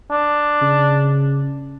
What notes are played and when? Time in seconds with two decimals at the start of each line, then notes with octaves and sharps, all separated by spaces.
0.11 D4
0.62 C#3